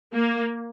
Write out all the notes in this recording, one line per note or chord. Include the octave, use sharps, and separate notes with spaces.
A#3